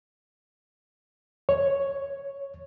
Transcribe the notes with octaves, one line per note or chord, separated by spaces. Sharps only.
C#5